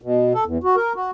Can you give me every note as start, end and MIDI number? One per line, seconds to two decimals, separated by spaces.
0.02 0.33 47
0.34 0.44 69
0.45 0.58 40
0.64 0.76 66
0.76 0.93 70
0.96 1.11 66